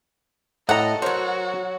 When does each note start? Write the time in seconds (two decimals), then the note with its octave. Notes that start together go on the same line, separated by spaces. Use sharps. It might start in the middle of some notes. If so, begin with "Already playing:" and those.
0.69 A2 A4 D#5 E5 F#5 A#5
1.02 F#3 F#4 A#4 C5 C#5